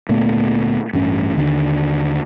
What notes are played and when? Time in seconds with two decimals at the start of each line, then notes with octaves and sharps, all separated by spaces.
0.09 D2 A#2 A3 B3
0.93 A1 G2 C#4
1.36 D#2 D3 G3 D4